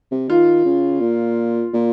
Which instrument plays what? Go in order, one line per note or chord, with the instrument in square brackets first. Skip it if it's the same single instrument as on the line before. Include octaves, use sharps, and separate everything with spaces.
[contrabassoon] C3
[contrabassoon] D#3 [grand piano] F4
[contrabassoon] C#3
A#2
A#2